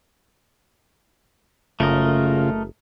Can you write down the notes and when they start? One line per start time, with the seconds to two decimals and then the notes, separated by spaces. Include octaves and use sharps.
1.80 F#1 C#3 A3 F4 A#4 D#5